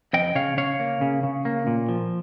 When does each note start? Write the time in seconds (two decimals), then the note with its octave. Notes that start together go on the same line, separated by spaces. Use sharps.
0.13 F2 D#5 G5
0.35 C#3 C#5 F5
0.57 C#3 C#5 F5
0.79 A#3
1.01 C#3
1.23 C#3
1.45 A#3
1.67 A#2
1.89 F3